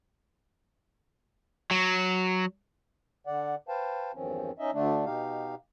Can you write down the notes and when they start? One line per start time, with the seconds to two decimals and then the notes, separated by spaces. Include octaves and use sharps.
1.71 F#3
3.27 D3 D5 F#5
3.69 B4 C5 F5 G5 A5
4.15 E2 G2 D#3 F3 C4 C#4
4.59 C#4 D#4 D#5 E5
4.73 D2 D3 A3 D4
5.05 B2 D#4 G4 F5